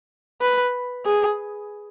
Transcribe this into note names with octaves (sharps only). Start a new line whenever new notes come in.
B4
G#4